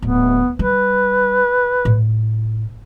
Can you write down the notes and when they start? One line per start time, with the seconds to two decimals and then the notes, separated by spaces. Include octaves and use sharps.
0.02 D1 B3
0.59 G3 B4
1.85 A2